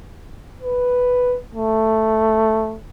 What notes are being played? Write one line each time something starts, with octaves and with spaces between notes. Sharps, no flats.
B4
A3